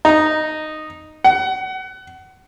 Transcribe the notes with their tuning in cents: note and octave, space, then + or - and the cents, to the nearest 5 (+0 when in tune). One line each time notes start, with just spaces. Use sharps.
D#4 -10
F#5 +25